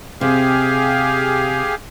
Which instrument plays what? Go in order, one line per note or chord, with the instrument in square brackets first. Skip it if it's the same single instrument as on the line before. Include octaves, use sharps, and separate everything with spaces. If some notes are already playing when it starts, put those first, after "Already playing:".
[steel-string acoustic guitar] C3 [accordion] G4 G#4 F5